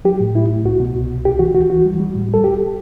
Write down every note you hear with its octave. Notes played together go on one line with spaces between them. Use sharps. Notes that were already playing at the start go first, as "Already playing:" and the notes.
F#3 G4
A2
A2 E4
A2
C2 F#4
B2
C2
C2
D2 G4
E3 F#4
D2 F#4
E3 F#4
G3
G3
A2
G3 A4
D2 G4